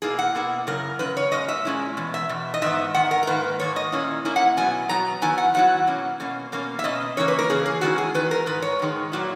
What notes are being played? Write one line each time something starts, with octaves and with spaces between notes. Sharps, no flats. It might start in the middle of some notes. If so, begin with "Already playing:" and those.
B2 A#3 E4 G#4
F#5
B2 A#3 E4
F#2 C#3 A#4
F#2 C#3 B4
C#5
A#2 G#3 C#4 D#5
E5
A#2 G#3 C#4 E4
E2 B2
E5
E2 B2
D#5
G#2 D#3 B3 E5
G#2 D#3 F#5
A#4
A#4
G#2 D#3 A#3 B4
G#2 D#3 A#3 C#5
D#5
A#2 A#3 C#4 E4
A#2 A#3 C#4 E4
F#5
B2 F#3 B3 G#5
B2 F#3 B3 A#5
D#3 F#3 B3 E4 G#5
F#5
D#3 F#3 B3 E4 F#5
B2 A#3 C#4
B2 A#3 C#4
B2 A#3 C#4
E5
B2 A#3 C#4 D#5
C#3 E3 A#3 C#4 C#5
B4
A#4
C#3 E3 A#3 C#4 G#4
G#4
E2 D#3 G#3 C#4 E4 F#4
G#4
E2 D#3 B4
A#4
G#2 D#3 B4
C#5
G#2 D#3 G#3
A#2 F#3 A#3 E4